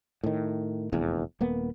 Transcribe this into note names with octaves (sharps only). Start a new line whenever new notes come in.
A2 D#3
F1 A#1 E2
D#1 A#3 B3